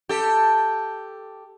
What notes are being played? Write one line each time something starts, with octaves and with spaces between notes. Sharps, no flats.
G4 A4